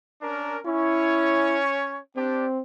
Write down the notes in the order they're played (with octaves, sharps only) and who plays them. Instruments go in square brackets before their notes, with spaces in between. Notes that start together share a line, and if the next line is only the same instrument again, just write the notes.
[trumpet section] C#4 D4 A#4
[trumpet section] C#4 C#5 [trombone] E4
[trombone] C4 [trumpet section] D4 G4